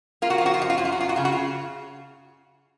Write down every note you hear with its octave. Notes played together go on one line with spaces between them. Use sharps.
A#3 F4
F#4
F4
F3 F#4
F4
F#2 F#4
F4
F#2 F#4
F4
F#4
F#2 F4
F#4
C#3 F4
F#4
C#3 F4